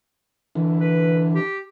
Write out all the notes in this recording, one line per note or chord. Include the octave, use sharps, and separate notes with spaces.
D3 E3
B4
G4